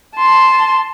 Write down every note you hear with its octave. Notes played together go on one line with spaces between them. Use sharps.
A5 C6